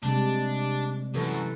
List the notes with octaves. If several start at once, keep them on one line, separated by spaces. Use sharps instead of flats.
C3 G3 G#3 D4
F#2 E3 A4 B4